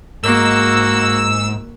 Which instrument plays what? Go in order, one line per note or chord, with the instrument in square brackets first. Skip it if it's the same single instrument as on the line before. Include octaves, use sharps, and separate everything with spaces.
[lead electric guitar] G#2 [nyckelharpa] A#3 F#4 [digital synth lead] E6